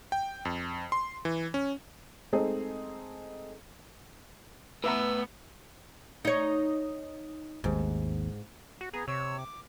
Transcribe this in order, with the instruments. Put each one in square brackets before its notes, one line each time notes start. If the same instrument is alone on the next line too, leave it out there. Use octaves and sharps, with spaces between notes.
[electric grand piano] G5
F2
C6
E3
C#4
[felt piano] G#3 A3 C4 D#4 G#4
[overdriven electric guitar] A2 [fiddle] B3 [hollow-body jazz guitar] B4 E5 A#5 [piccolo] E6
[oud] D#4 C#5
[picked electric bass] G#1 D#2 [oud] G#2
[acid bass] F#4
[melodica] B3 A#5 [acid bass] G#4
[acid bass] C3 [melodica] C#5 E6
[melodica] D6